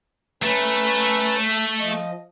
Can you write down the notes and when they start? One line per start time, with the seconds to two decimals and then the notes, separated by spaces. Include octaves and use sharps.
0.43 A3 C#4 B4 A#5
1.80 F3 D#5